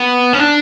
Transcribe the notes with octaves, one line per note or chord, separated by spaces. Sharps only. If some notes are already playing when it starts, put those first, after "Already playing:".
Already playing: B3
C#4
D4